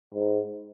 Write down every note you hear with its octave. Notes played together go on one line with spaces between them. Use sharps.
G#2